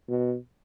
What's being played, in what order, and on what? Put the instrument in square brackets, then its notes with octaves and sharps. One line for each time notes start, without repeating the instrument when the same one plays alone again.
[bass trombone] B2